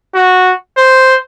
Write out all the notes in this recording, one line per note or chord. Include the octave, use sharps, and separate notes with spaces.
F#4
C5